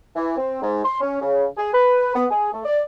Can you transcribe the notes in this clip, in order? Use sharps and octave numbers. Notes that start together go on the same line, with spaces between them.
E3
C4
G#2
C6
C#4
C#3
G#4
B4
B3
G#4
A3
D5